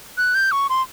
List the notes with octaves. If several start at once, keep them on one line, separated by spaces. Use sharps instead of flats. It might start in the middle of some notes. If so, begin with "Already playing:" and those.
F#6
G6
C#6
C6